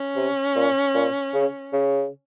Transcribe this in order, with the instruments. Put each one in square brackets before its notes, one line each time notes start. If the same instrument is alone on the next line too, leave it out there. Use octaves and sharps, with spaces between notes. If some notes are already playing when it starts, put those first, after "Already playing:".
Already playing: [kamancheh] C#4
[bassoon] C3
A#2
A#2
C#3
C#3